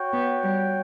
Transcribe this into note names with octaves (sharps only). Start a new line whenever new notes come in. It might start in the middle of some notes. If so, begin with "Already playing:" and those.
Already playing: F#4 C#5 G5
B3
G3